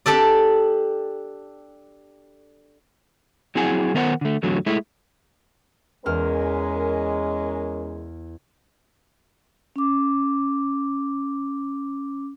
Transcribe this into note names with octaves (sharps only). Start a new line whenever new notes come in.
D4 G4 A4 D5
F#3 C4 E4 G#4 F#5 G#5
D#3 B3 A#4 C5 E5 F#5
D3 A3
E2 A2 D3 F#3
G#3 A3 E4
E2 G#3 C#4 A#4 F6
C#4 D6